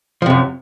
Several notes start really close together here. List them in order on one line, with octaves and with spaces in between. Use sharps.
F3 C3 F#2